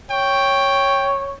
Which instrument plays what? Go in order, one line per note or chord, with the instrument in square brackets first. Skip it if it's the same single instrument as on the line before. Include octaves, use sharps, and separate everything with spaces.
[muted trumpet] C#5 [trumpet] G5